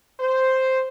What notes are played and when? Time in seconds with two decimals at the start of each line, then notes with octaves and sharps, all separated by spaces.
0.19 C5